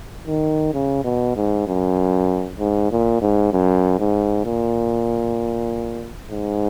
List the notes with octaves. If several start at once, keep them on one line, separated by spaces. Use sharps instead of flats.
D#3
C#3
B2
G#2
F#2
G#2
A#2
G#2
F#2
G#2
A#2
G#2